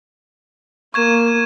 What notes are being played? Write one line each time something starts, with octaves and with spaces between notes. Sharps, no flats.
A#3 C#6 G#6 E7